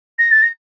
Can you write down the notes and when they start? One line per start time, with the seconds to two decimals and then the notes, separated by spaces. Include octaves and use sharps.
0.19 A#6
0.31 A6
0.43 A#6